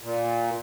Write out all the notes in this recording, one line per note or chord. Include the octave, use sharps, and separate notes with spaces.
A#2